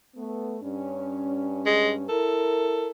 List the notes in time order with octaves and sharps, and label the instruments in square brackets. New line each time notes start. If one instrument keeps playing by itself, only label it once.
[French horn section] A3 B3
G2 C#4
[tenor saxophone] G#3
[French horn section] E4 A#4 [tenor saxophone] A4